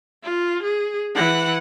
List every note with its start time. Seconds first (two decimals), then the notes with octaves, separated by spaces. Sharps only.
0.23 F4
0.63 G#4
1.15 E3 F#5